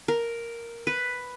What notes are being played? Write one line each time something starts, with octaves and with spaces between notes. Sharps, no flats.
A#4
B4